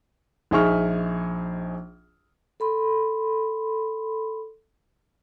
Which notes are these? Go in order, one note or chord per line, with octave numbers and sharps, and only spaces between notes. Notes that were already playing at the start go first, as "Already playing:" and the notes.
A#1 D#4 G#4 E5 C#6 F6
A4 B5 C6